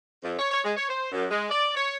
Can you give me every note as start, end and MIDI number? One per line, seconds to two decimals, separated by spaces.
0.24 0.35 41
0.39 0.47 73
0.51 0.60 73
0.64 0.73 56
0.77 0.85 73
0.89 1.08 72
1.12 1.25 42
1.31 1.46 56
1.50 1.73 74
1.75 1.97 73